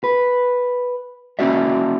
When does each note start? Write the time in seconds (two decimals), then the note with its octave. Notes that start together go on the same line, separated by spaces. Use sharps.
0.04 B4
1.39 A#3 C#4 F#4 D5 E5